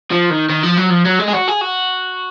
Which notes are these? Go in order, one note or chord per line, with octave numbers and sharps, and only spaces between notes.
F3
D#3
D#3
F3
F#3
F3
F#3
G#3
G#4
F#4
G#4
F#4